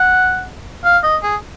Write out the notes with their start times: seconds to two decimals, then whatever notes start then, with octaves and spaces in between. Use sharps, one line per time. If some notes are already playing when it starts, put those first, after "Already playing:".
Already playing: F#5
0.84 F5
1.03 D#5
1.23 G#4